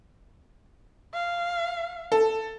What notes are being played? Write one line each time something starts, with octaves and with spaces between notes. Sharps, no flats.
F5
A4